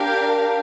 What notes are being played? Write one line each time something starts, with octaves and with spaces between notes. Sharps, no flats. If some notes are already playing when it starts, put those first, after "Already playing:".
Already playing: D4 G4 A#4 F5 G6